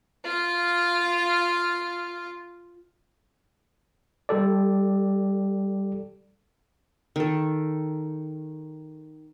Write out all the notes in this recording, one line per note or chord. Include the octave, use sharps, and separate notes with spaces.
F4 F5
G3 G4 A4 D5
D#3 A4